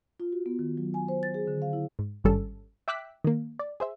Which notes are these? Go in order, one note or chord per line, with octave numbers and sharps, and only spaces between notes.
F4
F#4
B3
D#3
F#3
G#5
C5
A6
G#4
D3
F5
E4
G#2
G#1 G2 G3 C#4 A4
E5 G5 D6 E6 F#6 B6
D#3 A#3
D5
G#4 C5 E5